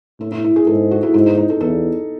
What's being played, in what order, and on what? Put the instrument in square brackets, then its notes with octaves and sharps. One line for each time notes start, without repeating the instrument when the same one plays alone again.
[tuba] A2 [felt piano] E4
[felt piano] E4
E4
G#4
[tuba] G#2 [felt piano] A4
[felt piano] F#4
E4
[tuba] G#2 [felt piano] E4
[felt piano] D#4
D#4
A4
[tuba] E2 [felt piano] A4